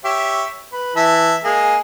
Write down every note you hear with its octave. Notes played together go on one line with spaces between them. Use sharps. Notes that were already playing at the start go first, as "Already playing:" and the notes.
G4 C#5 E5
B4
E3 E5 A5
G#3 A#3 G#4